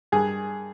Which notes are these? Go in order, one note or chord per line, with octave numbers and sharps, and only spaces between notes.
G2 G#4